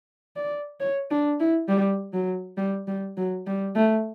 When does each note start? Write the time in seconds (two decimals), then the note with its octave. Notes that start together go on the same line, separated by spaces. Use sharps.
0.36 D5
0.81 C#5
1.11 D4
1.40 E4
1.69 G3
2.13 F#3
2.57 G3
2.88 G3
3.17 F#3
3.46 G3
3.76 A3